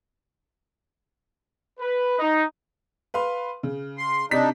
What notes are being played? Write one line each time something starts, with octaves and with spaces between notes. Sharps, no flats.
B4
D#4
B4 F5 C6
C#3
C6
C3 D4 D#4 B6